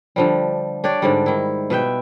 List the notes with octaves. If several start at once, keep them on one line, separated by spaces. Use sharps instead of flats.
D3 F3 G3
D4 G4 C#5 D5
G#2 D3 G3
D#3 E4
B2 B4 E5 G5